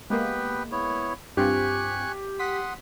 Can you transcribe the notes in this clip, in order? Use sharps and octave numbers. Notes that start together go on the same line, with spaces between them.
G#3 A#3 B3 G4 B4
B3 E4 C#5
G2 C4 F4 G4 G#5 C#6 F#6
F#5 C6 D#6 B6